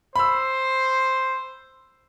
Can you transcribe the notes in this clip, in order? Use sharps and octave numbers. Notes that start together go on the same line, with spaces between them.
C5 B5 E6